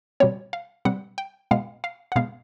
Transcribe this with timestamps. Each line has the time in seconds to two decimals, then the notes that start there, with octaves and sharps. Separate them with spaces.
0.20 B2 G3 C4 C#5
0.53 F5
0.85 B2 G3 C4 F#5
1.18 G5
1.51 B2 G#3 B3 F5
1.84 F5
2.12 F#5
2.16 B2 G#3 B3 F5